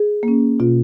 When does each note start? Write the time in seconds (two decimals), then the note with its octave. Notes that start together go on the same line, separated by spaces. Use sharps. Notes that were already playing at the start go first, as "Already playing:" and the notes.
Already playing: G#4
0.23 A#3 C#4
0.60 B2 F4